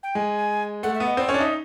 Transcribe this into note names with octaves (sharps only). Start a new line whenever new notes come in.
G5
G#3 G#5
A3 F#5
E5
B3
D#5
C4 D5
C#4 C#5
D4
D#4 E5